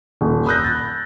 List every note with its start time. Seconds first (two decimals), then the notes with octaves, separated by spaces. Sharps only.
0.21 D#1
0.46 B5 D#6 E6 F#6 G6 A#6
0.64 A6